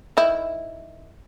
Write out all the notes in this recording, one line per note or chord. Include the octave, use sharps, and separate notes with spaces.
D#3 E4